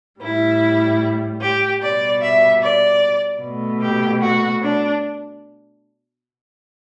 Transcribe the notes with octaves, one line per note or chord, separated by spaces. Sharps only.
A2 G3 E4
G4
B2 G3 D5
E5
D5
B2 A3
G4
F#4
D4